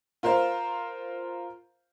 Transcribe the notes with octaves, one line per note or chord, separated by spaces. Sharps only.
F4 A#4 C5 F5